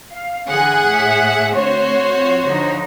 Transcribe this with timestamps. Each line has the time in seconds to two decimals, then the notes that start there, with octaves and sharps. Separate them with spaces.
0.11 F5
0.48 D3 E3 G#4 F#5
0.86 A2 E5
1.55 D3 A3 C4 F#4 C5 C#5
2.12 F3 C4
2.48 D3 F3 D#4